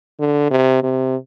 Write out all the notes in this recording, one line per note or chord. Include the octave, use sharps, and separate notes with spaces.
D3
C3
C3